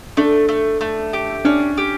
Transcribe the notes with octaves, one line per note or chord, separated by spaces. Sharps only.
A3 D4
A3
A3
G4
C#4 D4
G4